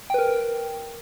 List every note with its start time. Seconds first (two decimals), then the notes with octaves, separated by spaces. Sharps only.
0.10 G5
0.14 B4
0.18 A#4